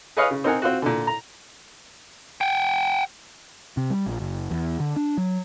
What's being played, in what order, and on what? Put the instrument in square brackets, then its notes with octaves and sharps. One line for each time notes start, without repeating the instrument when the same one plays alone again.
[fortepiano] G#4 B4 C#5 D#5 F5
C#3
C4 D#4 A#4 F#5 G#5
C4 F4 F#4
A#2 D3
A#5
[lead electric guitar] F#5 G5
[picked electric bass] C3
G3
A#1
F#1
E2
D3
D4
F#3